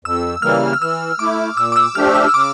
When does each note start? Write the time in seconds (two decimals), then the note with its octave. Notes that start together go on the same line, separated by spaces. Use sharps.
0.05 F2 E6
0.42 C#3 E3 G3 A#3 F6
0.73 F6
0.81 E3 E6
1.19 A3 E4 D6
1.57 A#2 E6
1.72 D6
1.76 E6
1.95 F3 A3 D4 G4 F6
2.14 E6
2.28 E6
2.34 C#3 D6